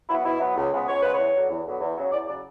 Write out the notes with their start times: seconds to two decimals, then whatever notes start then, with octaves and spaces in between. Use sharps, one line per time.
0.09 F#3 B3 E4
0.25 B2 E4
0.40 F#3 B3
0.57 C#2
0.72 C#3 G#3 B3
0.88 C#2 C#5
1.00 C#3 G#3 B3 B4
1.13 C#5
1.19 E2
1.35 D3 F#3 B3
1.50 E2
1.66 D3 F#3 B3
1.80 E2
1.96 C#3 F#3
2.12 E2 D5
2.27 C#3 F#3 D5